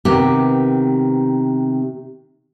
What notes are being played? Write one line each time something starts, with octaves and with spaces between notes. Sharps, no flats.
C3 D#3 B3 G4